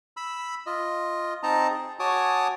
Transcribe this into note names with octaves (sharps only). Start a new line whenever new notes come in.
B5 E6
F4 D#5
C4 D#4 D#5 A5 A#5
G#4
F#4 C#5 G#5 A5 D6 D#6